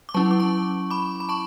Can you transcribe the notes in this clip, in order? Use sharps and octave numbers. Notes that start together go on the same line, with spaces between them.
D6
F#3 C#4 E4 A5 C#6
D6
A5 C#6
B5 D6
B5
A5 C#6